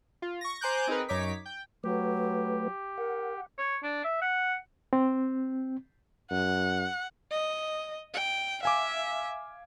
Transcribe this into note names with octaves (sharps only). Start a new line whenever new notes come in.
F4
C#6 A#6
C5 G#5 A#5 D6 F#6 G6
C4 D#4 G#4 A#4 B4
F#2 D#4 C#5 D6 B6
G5
F#3 A3 G4 B4
A#4 F#5
C#5
D4
E5
F#5
C4
F#2 F#5
D#5
G5
E5 F5 G#5 D6